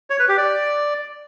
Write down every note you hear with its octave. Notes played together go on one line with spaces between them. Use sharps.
C#5
B4
G4
D5